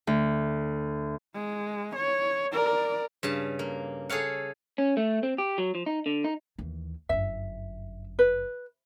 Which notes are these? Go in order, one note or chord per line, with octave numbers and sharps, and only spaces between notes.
D2
G#3
C#5
A#4 D5
G2 C#3 A5
A#3
G#4 A4 C#5 F5 F#5
C#4
A3
C4
G4
F#3
F3
D#4
D3
D#4
D#2 E3
G1 F#2 E5
B4